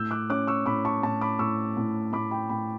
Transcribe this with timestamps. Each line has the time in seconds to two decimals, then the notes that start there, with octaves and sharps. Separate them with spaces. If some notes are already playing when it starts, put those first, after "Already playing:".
Already playing: A2 E6 G6
0.11 D6 F#6
0.30 C#4 D6 F#6
0.47 C#6 E6
0.66 A2 B5 D6
0.85 A5 C#6
1.03 A2 A5 C#6
1.21 B5 D6
1.39 A2 C#6 E6
1.77 A2
2.13 A2 B5 D6
2.31 G5 B5
2.49 A2 G5 B5